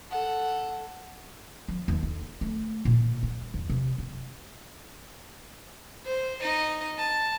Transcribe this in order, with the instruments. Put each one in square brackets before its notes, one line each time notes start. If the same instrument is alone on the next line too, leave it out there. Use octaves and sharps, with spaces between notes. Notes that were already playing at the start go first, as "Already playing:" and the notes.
[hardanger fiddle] A4 F#5
[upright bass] F3
D#2
D3
A3
A#2
G3
E2
C3
F#2
[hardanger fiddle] C5
D#4 D#5
A5